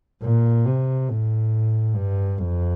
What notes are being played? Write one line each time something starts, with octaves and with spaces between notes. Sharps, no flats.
A#2
C3
A2
G2
F2